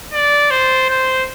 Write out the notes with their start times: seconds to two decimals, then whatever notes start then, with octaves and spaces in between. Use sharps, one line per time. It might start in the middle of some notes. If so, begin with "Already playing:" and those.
0.13 D5
0.51 C5
0.89 C5